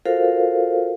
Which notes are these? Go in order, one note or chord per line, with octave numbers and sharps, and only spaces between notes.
F4 F#4 A4 A#4 C5 F5